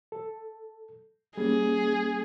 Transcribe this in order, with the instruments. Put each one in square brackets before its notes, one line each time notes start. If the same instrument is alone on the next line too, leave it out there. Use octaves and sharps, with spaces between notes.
[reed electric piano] A4
[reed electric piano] G3 A#3 C#4 [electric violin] G#4